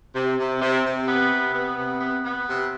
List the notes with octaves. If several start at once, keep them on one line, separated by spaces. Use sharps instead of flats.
C3
C3
C3
C3
B3
C3
B3
C3
B3
B3
C3